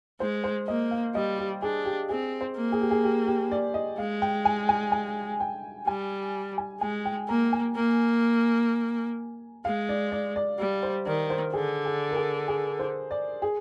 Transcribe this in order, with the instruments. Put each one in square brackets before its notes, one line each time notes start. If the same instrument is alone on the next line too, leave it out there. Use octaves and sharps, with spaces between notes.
[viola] G#3 [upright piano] C5
[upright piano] C5
[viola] A#3 [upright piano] D#5
[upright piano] F5
[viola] G3 [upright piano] D#5
[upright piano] G4
[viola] D4 [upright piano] G#4
[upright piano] G4
[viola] C4 [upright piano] G#4
[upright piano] C5
[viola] A#3
[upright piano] G#4
G4
G#4
G4
G4
D5
D#5
[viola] G#3 [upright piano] F5
[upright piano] G5
G#5
G#5
G#5
G5
[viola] G3 [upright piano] G#5
[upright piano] G#5
[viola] G#3 [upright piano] G#5
[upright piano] G5
[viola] A#3 [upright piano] A#5
[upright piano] G#5
[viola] A#3
[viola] G#3 [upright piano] F5
[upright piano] D5
D5
D5
[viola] G3 [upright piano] D5
[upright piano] C5
[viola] D#3 [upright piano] D5
[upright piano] C5
[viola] D3 [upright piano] G#4
[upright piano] G#4
A#4
G#4
G#4
C5
D5
G#4